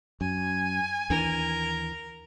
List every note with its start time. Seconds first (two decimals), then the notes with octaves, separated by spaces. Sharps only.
0.21 F#2 G#5
1.10 D#2 E3 D4 A#4